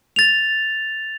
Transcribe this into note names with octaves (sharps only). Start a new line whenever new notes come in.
A6 F7